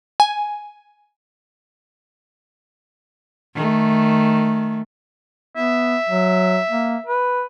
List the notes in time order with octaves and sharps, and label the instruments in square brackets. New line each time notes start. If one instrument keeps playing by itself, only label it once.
[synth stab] G#5
[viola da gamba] D#3 A3
[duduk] B3 [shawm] E5
[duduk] F#3
A#3
B4